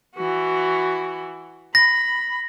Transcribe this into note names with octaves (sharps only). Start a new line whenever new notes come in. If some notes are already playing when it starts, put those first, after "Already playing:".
E3 F#4
B5 A#6